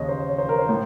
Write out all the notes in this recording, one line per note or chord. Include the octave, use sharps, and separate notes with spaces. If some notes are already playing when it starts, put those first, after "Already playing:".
Already playing: D#2 C#3 C#5 D#5
C5
C#5
C5
A#4
C5
A2